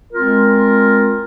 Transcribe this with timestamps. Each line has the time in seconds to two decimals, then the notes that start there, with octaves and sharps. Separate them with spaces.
0.13 G#3 C4 F4 A#4